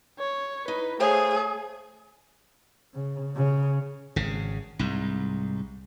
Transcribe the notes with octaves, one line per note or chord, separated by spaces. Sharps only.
C#5
D#4 B4
A3 G#4 C5 C#5 F5
C#3
C#3
G#1 C#3
C2 G#2